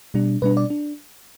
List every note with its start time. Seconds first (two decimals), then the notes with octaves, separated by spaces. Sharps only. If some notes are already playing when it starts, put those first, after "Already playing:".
0.14 B2 G3 D4
0.42 B2 G3 D4 B4
0.57 D5
0.70 D4